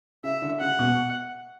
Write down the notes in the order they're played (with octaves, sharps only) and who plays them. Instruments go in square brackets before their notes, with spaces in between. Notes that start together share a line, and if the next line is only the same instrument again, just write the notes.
[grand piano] C#3 [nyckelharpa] E5
[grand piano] D3
[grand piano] C#3 [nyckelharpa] F#5
[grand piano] B2